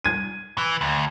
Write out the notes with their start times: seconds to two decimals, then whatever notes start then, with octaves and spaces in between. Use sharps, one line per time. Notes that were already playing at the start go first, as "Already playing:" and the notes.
0.04 G#6 D#7
0.58 E3
0.81 D2